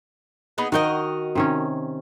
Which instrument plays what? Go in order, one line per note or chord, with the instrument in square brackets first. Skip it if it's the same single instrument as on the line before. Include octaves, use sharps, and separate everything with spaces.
[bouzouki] B3 D#4 G#4
[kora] D#3 G5 [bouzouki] F#4 A#4 D#5
[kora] C3 D#3 C#4